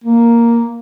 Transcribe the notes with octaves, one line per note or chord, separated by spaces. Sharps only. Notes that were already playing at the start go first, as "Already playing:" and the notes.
A#3